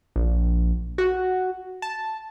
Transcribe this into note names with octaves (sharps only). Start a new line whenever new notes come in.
A#1
F#4
A5